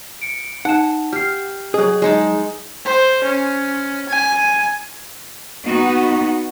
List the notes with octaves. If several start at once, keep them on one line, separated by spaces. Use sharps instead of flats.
C#7 D7
D#4 F#5 A5 E7
G4 F6 C7
F#3 G#4 D#5
G#3 D#4 A5
C5
C#4
G#5
B3 D#4 F#4